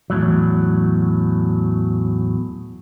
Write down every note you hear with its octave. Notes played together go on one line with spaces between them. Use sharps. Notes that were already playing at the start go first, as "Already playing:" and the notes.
E2 A2 F#3